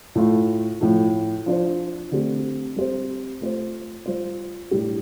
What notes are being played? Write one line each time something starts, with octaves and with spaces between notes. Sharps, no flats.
A2 A3 F4
A2 F3 A3
F3 D4 F4 C5
D3 A3 C4 G4
G3 C4 G4 C5
A3 F4 C5
G3 F4 C5
A2 G3 D4 G4